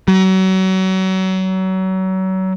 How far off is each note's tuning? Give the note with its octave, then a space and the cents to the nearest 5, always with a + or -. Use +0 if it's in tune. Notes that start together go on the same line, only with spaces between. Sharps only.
F#3 +30